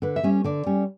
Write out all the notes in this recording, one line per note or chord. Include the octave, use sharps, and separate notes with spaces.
D3 B4
E5
G3 C#4
D3 D5
G3 C#4